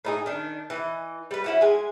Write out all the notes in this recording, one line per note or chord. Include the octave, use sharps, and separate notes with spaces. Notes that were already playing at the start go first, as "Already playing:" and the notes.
A2 D#4 G#4
D#3 D4
E3 D#5
G3 B4
C#4 E4 F#4
G#3 G#5